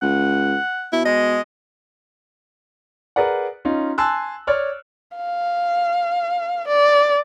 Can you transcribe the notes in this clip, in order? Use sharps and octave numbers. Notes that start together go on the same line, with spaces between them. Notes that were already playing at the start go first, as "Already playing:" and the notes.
C#2 F#5
B2 E4
G#3 D#5
G#4 A#4 B4 D5 F#5
C#4 D#4 F4
G#5 A5 C6 E6 F#6
C#5 D5 F6
F5
D5